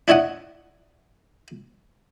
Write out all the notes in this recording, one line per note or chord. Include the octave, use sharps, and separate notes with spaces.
D4 E4 C#5 D#5 F#5